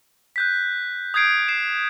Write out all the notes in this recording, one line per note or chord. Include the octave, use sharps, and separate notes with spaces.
F#6 G6 B6
D#6 G6 G#6 C7 D7
C7 E7